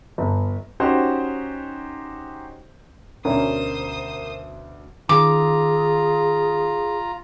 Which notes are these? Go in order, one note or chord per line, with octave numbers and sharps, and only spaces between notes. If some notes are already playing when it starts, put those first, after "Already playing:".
G1
C#4 D#4 F#4 G4 C5
D2 B2 C#4 D4 A#4 C5 D#6
D#3 F4 G#4 A#5 D6